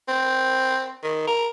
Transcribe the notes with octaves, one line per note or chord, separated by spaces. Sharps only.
C4
D#3
A#4